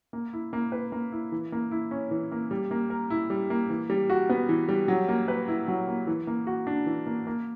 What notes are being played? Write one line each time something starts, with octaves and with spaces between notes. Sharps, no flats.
A#3
E4
A#3
B4
A#3
E4
E3
A#3
E4
C#4
E3
A#3
G3
A#3
A#4
E4
G3
A#3
E3
G3
F#4
B3
E3
G3
F#3
A#3
B4
E4
F#3
A#3
E3
A#3
F#4
D4
E3
A#3
A#3